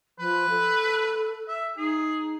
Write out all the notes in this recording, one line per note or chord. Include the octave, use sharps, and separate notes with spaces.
F3 B4
A4
E5
D#4 G#4